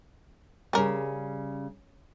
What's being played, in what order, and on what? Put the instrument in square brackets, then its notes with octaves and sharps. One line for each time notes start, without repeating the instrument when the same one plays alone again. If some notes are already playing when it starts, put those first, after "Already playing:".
[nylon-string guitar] C#3 G3 [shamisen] C#4 A#4